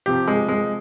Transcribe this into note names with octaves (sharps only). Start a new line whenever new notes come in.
C3 F3 G4
G#3
G#3